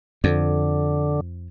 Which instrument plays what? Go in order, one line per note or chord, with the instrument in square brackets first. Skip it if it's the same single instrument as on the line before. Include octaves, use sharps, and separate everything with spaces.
[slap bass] F2 [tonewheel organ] D3